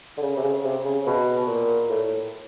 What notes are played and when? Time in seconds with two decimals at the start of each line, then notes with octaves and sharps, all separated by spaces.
0.17 D3
0.22 C#3
0.36 C3
0.44 C#3
0.65 C3
0.85 C#3
1.07 B2
1.47 A#2
1.89 A2